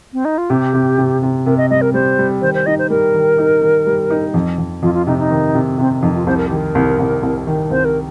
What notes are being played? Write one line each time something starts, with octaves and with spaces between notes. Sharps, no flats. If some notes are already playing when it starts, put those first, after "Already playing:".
C4
D#4
F4
C3 G4
C3
C3
C3
C3 A#4
D#5
G3 D#5
A#4
G3 C5
G3
D#3 C5
C5
D#4 D#5
C5
G3 A#4
D#3
D#4
D#3
G3
D#4
F2
F2
F2 F4
F4
C3 D#4
D#4
D#3
C3
C3 C4
F2 D#4
F4
C2 C5
A#4
D#3 G4
A#4
C2
C2
C2
D#3
C2 C5
A#4